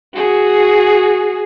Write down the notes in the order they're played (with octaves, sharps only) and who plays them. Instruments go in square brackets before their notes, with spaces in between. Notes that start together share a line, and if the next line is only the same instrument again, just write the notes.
[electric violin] F#4 G#4